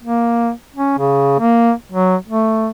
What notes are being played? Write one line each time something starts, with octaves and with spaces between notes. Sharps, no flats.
A#3
C#4
C#3
A#3
F#3
A3